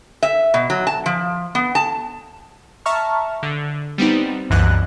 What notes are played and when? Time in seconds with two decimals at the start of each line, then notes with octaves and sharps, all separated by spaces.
0.23 E5
0.54 B2
0.70 F#3
0.87 A5
1.06 F3
1.55 B3
1.75 A5
2.86 E5 A5 A#5 C#6 F6
3.43 D3
3.98 G3 B3 C4 D#4
4.50 C2 F#2 E3 D#5 F#6